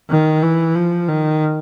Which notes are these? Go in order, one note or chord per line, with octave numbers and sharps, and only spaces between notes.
D#3
E3
F3
D#3